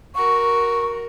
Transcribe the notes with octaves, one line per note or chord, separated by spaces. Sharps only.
F#4 A#4 C#6